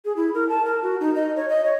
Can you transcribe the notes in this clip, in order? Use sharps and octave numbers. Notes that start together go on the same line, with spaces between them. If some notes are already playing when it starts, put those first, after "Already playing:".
G#4
E4
A#4
A5
A#4
F#4
D#4
D#5
C#5
D#5
C#5